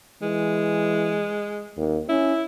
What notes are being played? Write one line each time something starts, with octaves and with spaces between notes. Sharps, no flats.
E3 G#3
D#2
C#4 E4